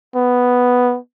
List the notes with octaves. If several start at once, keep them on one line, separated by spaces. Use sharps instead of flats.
B3